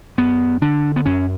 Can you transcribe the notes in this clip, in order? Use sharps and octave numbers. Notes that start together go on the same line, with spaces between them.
F#2 B3
D3 D4
B3
F#2 C#4